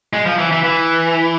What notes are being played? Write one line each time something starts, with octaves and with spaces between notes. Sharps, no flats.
G#3
F3
E3
E3
E3